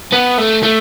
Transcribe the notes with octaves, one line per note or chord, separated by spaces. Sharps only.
B3
A3
A3